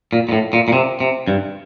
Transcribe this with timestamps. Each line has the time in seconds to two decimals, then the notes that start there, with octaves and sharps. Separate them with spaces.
0.13 A#2
0.29 A#2
0.32 A2
0.53 A#2
0.68 A#2
0.73 C3
1.00 C3
1.28 G2